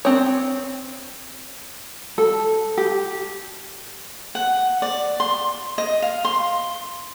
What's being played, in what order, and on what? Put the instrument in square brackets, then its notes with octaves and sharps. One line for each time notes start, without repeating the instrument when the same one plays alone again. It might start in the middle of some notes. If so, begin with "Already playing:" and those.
[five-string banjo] C4 C#5
[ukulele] A4
G4
[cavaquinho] F#5
D5
C6
D#5
F5
C6